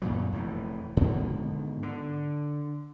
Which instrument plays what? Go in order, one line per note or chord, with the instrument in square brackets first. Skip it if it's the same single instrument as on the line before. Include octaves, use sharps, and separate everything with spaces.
[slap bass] F#2 A#2 E3 F#3
F1 A2 E3
G#2 B2 D3 D#3
D3